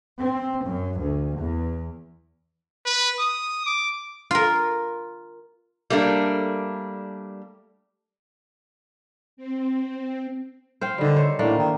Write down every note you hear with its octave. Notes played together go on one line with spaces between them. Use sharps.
C4
F#2
D2
E2
B4
D#6
D6
F4 A#4
G3 A3 A#3 D4
C4
C5 F5 G5
D3 D#3 G3
C5 C#5
A2 A3 A#3 D4
D#3